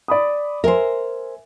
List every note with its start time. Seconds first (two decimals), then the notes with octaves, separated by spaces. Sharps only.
0.08 D5 B5 D#6
0.64 A#4 C5 E5 G#5